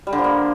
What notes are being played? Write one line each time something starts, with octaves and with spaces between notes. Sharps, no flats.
G3
D3
F3
A#3